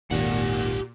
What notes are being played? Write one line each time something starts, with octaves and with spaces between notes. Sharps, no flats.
G#1 D#2 A#2 G4 F#5